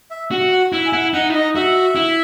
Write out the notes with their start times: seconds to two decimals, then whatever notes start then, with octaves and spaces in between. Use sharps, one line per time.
0.11 E5
0.31 F#4
0.52 F#5
0.73 E4 E5
0.86 G#5
0.93 E4 F#5
1.13 D#4 F#5
1.30 E4
1.35 D#4 D#5
1.55 F#4 E5
1.96 E4